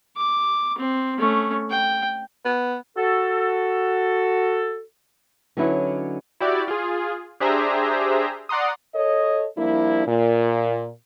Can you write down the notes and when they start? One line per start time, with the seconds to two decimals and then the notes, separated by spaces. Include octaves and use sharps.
0.17 D6
0.79 C4
1.18 A3 C#4
1.70 G5
2.45 B3
2.97 F#4 A4
5.57 D3 F#3 C#4 D#4 E4 B4
6.40 E4 F#4 G4 D5
6.68 F4 G#4
7.40 D4 G4 G#4 C5 E5 A#5
8.49 D5 F#5 A#5 C6 D#6
8.94 A4 C#5 D#5
9.57 F3 G3 A#3 D4 E4
10.07 A#2